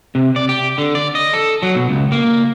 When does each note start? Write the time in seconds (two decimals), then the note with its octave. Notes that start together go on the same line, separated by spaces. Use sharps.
0.15 C3
0.36 D5
0.49 G4
0.78 D3
0.95 D5
1.15 D#5
1.33 A4
1.63 F#3
1.75 B2
1.89 C#2
2.12 A#3